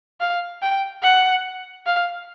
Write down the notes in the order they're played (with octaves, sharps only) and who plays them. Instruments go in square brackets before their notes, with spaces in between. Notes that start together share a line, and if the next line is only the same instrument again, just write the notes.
[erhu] F5
G5
F#5
F5